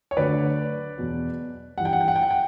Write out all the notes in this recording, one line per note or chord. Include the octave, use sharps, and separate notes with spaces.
C#5
D2 D3 F#3 B4 D5
E2 B2 F#3
G2 E3 F#5
G5
F#5
G5
F#5
G5
F#5
G5